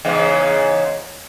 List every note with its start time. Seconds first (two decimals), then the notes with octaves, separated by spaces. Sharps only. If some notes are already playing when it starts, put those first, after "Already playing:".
0.05 E2 G#2 C#3